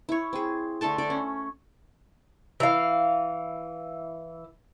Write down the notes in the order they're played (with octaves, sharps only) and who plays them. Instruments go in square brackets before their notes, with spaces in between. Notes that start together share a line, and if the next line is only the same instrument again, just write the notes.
[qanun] E4 C#5
C4 G#4
D3 A3 A4 A5
D3 D5 D6
C#4
[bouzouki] E3 F5